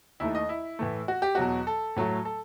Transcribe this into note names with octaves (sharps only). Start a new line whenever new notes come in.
D#2 D#3 A3 E4
D#5
E4
A2 E3 A3
F#4
G4
E2 B2 F#3 F#4
A4
A2 F#3 A3
A4